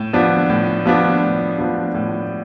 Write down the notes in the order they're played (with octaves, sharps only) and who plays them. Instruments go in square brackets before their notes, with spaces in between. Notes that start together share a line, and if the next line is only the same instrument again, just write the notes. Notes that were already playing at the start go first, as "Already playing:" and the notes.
Already playing: [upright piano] A2
F3 B3 D4
A2
F3 B3 D4
A2
F3 B3 D4
A2